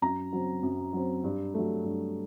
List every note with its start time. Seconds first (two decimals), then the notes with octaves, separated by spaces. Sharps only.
0.02 F#2 A#5
0.33 F#3 C4
0.63 F#2
0.93 F#3 C4
1.24 G2
1.54 F#3 A3
1.84 G2